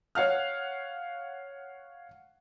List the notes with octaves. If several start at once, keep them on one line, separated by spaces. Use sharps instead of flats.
C#5 F5 F#5 F6